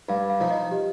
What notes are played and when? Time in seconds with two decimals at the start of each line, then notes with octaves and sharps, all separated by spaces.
0.09 G2 F5
0.30 F5
0.40 F3 D#4
0.51 D#5
0.71 G4